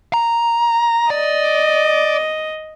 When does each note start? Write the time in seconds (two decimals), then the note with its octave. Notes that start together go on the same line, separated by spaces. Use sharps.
0.14 A#5
1.10 D5 D#5